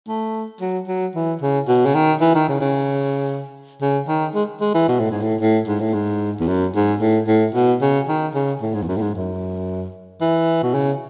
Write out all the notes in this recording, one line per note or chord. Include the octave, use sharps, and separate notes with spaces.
A3
F#3
F#3
E3
C#3
B2
C#3
D#3
E3
D#3
C#3
C#3
C#3
D#3
G#3
G#3
E3
B2
A2
G#2
A2
A2
G#2
A2
G#2
E2
F#2
G#2
A2
A2
B2
C#3
D#3
C#3
A2
G#2
E2
F#2
A2
G#2
F#2
E3
B2
C#3